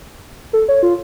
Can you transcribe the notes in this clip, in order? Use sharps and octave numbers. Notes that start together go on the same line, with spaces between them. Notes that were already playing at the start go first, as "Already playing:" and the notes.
A4
C#5
F4